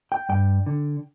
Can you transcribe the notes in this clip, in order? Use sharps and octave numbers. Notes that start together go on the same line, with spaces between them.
G5
G2 G5
D3